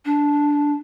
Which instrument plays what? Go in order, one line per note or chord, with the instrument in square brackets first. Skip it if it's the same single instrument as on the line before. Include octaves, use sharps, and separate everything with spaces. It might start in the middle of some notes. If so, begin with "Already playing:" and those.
[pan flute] D4